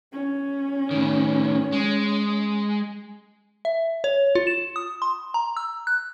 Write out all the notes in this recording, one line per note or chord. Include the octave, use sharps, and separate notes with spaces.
C#4
A2 D#3
G#3
E5
C#5
F4
E7
D#6
C6
A#5
E6
F#6